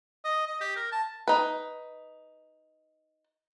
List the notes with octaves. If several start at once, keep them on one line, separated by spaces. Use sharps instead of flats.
D#5
D#5
G4
A#4
A5
D#4 B4